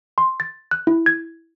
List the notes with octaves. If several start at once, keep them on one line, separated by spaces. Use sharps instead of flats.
C6
A6
F#6
E4
G#6